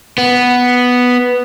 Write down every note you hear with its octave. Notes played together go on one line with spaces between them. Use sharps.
B3